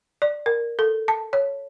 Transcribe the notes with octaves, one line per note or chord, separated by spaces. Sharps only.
D5
A#4
A4
A5
C#5